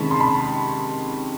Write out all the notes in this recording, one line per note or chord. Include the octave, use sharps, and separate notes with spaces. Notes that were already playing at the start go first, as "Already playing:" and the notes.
Already playing: C3 D#3 G#3 C#4 A5 B5
C6
A5 B5